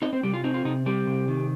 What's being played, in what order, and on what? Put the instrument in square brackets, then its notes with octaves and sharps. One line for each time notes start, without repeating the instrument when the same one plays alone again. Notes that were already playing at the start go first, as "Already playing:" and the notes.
[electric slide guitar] C4 D#4 D#5
C4 C5
C3 G3 G4
F4
C4 D#4
F4
C3 D#4
G3 C4 G4
C3
D#3